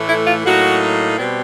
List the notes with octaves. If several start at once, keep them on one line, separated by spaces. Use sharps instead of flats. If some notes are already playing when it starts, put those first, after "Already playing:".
Already playing: A2 E3 A3
E4
F4
A2 F#3 A#3 D#4 F#4
B2 G3 C4